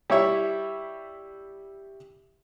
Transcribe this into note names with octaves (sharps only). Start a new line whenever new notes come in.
G3 E4 C#5 E5